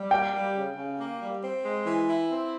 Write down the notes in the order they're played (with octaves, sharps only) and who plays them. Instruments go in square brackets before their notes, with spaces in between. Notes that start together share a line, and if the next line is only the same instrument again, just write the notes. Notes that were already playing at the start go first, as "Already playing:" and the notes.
Already playing: [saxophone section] G3
[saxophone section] A#3 [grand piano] G5
[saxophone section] G3
C#3
C#3
A#3
G3
C4
G#3
E3
E4
C4